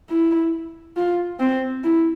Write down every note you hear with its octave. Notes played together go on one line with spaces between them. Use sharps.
E4
F4
C4
E4